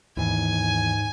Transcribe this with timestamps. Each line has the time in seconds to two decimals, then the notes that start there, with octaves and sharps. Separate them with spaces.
0.17 D#2 G#2 E3 G#5